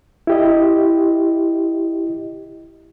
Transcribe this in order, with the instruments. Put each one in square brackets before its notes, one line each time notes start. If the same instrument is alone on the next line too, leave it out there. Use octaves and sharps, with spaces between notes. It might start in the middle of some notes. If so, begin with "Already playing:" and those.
[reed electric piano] E4 G4 D#5